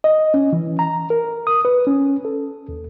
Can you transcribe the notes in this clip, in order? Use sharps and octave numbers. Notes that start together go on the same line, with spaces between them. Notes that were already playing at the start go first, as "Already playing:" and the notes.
D#5
C#4
E3
A#5
A#4
D#6
B4
C#4
A4
D#2